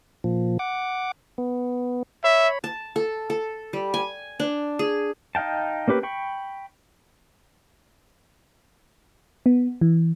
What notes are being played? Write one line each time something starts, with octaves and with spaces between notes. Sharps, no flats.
A#2 F3
F#5 D6
B3
C#5 E5 B5
A5
A4
A4
G3
G#5
D4
G#4
D#4 D#5 F5 G5 A5
A#3 C#4 G4 B4
G5 B5 C#6
B3
E3